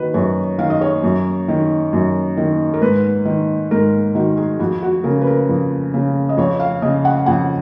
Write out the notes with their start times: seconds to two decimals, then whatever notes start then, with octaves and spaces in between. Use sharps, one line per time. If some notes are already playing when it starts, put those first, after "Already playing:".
Already playing: D#3 F#4 B4
0.14 F#2 C#5
0.59 D#3 F5
0.70 D#5
0.81 C#5
1.03 F#2
1.48 D#3
1.93 F#2
2.37 D#3
2.74 A#4
2.81 G#2 B4
3.25 D#3
3.71 G#2 A#4
4.15 D#3 F#4
4.37 G#4
4.60 F2 F#4
4.83 F#4
5.04 C#3 A#4
5.21 B4
5.27 A#4
5.49 F2
5.94 C#3
6.29 D#5
6.37 F2 C#5
6.60 F5
6.82 C#3 D#5
7.05 F#5
7.26 F2 F#5